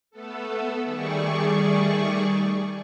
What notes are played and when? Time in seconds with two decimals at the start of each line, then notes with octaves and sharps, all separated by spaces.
0.11 A3 B3 A4
0.84 D#3 G3 A3 G#4 D5 C#6